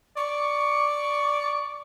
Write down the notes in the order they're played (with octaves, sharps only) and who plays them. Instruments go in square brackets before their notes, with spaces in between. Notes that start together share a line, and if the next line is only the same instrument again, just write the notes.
[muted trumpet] D5 [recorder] C#6